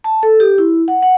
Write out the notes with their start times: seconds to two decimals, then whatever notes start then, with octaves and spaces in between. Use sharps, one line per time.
0.04 A5
0.23 A4
0.40 G4
0.58 E4
0.88 F#5
1.03 F#5